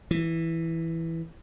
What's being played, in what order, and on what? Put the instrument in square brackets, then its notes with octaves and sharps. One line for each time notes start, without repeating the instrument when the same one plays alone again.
[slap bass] E3